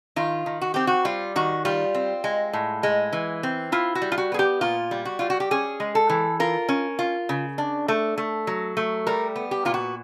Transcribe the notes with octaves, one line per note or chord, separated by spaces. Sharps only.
D#3 F4
D#3
F#4
C4 G4
F#4
G3 F4
D#3 F#4
G3 F4
C4
G#3
A2
G#3
E3
C4
E4 F4
F#4
G3
F4
F#4
B3 G#4
G4
A#2 F4
G3
F#4
G3 F4
F#4
G4
C#4 G#4
G#3
A4
E3
F4 A#4
C#4
F4
C#3
D4
A3
A3
F#3
A3
G3 A#4
B3
G4
A#2 F4
F#4